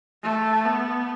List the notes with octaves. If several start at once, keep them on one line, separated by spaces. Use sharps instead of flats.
A3
B3